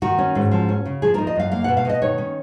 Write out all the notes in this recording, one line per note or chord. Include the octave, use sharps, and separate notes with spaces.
D#3 F#4
C#4
G#2
F3
C#4
C#3
F3 G#4
D#4 A#4
D#5
F#2 F5
A#3 F5
B2 F#5
F5
B2 D#5
D#3 C#5
C#4